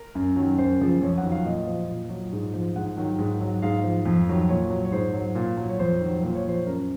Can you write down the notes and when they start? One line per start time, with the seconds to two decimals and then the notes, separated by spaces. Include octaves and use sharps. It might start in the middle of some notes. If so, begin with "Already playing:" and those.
Already playing: A#4
0.15 F#2
0.36 D#3 F#3
0.58 F#2 C5
0.80 C#3 F3
1.01 F2 C#5
1.18 F#5
1.23 D#3 F#3
1.31 F5
1.45 A#2 D#5
1.67 F3
1.89 A#2
2.10 F#3
2.32 G#2
2.54 F3
2.76 G#2 F#5
2.97 D#3 F#3
3.18 G#2
3.41 F#3
3.62 G#2 F5
3.84 F3
4.05 F2
4.28 D#3 F#3
4.49 A#2 C#5
4.70 F#3
4.85 C#5
4.92 G#2 C5
5.14 F#3
5.35 A#2
5.57 F#3
5.69 C#5
5.79 F2 C5
6.00 D#3
6.06 F#3
6.23 A#2 C5
6.35 C#5
6.45 F3 C5
6.66 F#2 A#4